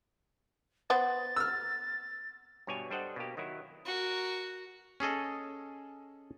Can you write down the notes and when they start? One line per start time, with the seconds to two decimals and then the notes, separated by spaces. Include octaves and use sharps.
0.90 B3 B4 C5 A6
1.36 E6 F6
2.67 G2 B2 C#5 D5 G#5
2.91 G3 D4 A4 C5 D#5 F#5
3.16 B2 A#3 G4
3.37 D#3 F#3 E4
3.85 F#4 A#4
5.00 C#4 G#4 A4 D#5